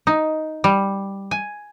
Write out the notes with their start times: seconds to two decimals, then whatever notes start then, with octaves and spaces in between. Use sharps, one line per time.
0.07 D#4
0.64 G3
1.31 G#5